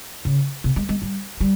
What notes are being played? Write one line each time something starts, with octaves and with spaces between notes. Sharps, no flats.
C#3
C3
G#3
G#3
G3
G3